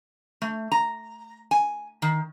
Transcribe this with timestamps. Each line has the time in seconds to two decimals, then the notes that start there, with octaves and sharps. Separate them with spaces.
0.42 A3
0.72 A#5
1.51 G#5
2.02 D#3